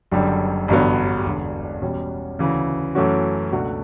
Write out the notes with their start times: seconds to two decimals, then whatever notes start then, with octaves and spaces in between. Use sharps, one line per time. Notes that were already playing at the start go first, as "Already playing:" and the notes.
0.11 F#1 F#2 D3 G3
0.68 A1 G2 D3 F#3 B3
1.25 E1 E2 D3
1.81 E2 B2 G3 C#4
2.39 D2 C#3 E3
2.95 F#2 E3 A3 C#4 F#4
3.52 C#2 B2 A3 D4 F#4